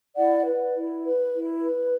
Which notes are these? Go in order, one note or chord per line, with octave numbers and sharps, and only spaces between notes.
E4 D5 F#5
B4
E4
B4
E4
B4